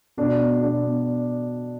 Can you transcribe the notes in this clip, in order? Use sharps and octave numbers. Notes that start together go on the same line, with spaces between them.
B2 D4
B3
B2 D4
B3